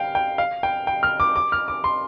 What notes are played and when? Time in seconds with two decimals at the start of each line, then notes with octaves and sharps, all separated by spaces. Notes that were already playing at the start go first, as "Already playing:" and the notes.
Already playing: F5 G5
0.15 G5
0.38 F5
0.63 G5
0.87 G5
1.03 F6
1.20 D6
1.36 D6
1.52 F6
1.68 D6
1.84 C6